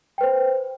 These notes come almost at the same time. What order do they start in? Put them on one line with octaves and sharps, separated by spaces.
G5 B4 C5